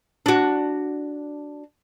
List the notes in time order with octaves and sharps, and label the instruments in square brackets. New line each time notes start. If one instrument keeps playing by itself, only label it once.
[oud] D4 F#4